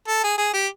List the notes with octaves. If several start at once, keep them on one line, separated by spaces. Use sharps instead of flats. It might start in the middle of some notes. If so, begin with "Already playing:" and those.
A4
G#4
G#4
G4